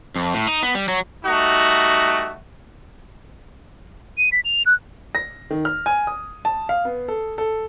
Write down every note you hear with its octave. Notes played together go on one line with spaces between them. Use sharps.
F2
A2
D#4
B3
G3
F#3
G3 A3 D#4 F#4
D#7
B6
F7
F#6
A#6
D#3
F6
G#5
D#6
A5
F5
B3
A4
A4